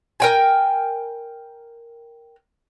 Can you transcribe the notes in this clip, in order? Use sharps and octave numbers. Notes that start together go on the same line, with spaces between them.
A#4 G5 G#5